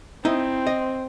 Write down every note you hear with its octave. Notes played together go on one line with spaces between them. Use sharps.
C4 D#4 E4 D#5
D#5